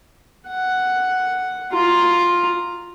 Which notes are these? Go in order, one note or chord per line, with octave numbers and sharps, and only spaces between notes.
F#5
F4 A#5